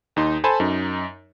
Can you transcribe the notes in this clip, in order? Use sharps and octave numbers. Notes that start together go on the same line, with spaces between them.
D#2 D#4 C6
A4 C5 G#5 A5 B5
F#2 D#4